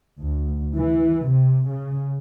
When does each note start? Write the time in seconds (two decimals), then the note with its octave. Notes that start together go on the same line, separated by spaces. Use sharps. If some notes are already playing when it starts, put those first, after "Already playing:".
0.22 D2
0.77 E3
1.28 C3
1.69 C#3